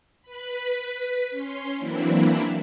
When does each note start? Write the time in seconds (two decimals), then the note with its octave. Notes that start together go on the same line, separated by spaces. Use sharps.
0.22 B4 B5
1.30 C#4 C6
1.76 E3 F#3 A#3 C4 D4 E4